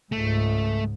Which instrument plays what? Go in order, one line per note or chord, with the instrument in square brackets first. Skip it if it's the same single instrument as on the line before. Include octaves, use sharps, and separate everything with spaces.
[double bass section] C#2 G#2 [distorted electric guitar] A3